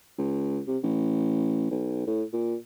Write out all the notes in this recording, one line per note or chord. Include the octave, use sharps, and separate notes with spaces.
C#2
C3
A1
B1
A2
A#2